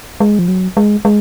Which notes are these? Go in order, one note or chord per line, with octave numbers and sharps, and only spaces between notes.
G#3
F3
F#3
G#3
G#3